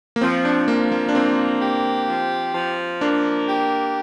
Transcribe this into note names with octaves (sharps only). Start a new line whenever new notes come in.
A#3
F3 C4
D4
F3 A#3
A#3
D4
A#3 C4
G4
F3
F3
A#3 D4
G4